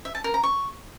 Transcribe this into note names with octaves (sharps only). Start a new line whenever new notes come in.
E5
A5
A#4
A#5
C#6